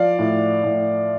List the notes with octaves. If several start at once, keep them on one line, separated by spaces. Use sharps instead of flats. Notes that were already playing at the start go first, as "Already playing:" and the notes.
Already playing: F3 D5 F5
A2
A2